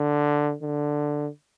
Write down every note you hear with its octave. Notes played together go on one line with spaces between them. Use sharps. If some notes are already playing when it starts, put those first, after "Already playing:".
Already playing: D3
D3